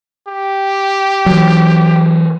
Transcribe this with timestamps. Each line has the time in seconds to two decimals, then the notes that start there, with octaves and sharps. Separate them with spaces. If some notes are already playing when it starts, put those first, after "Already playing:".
0.28 G4
1.26 E3 F#3